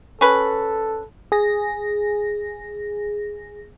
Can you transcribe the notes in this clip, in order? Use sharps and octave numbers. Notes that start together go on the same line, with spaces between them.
C#4 A4 B4
G#4 A#6